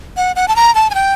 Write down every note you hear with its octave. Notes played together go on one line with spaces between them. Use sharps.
F#5
F#5
A5
A#5
A5
G#5
G5